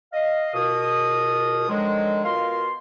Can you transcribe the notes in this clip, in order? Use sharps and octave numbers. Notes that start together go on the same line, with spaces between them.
D#5 F5
C#2 B2 A#4 D#6
D3 D#3 F3 F#3 G#3
B2 F4 A#4 F5 C6